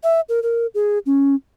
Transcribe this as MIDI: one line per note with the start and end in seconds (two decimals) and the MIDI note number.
0.03 0.21 76
0.29 0.40 70
0.43 0.67 70
0.75 0.99 68
1.06 1.35 61